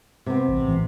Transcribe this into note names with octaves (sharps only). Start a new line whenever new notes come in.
C3 B3
A1
A1